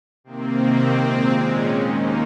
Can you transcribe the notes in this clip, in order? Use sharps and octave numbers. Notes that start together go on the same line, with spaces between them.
C3 D#3 A#3 C4
A#2 G#3
C#4
D#2 D#3 A#3 D#4